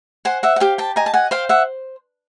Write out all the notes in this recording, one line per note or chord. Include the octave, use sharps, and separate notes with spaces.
C5 F#5 G#5
E5 F#5
F#5
G4 F5 G5
G5 A5
D#5 G#5 A#5
A5
F#5 G#5
C5 F5 G5
E5 F#5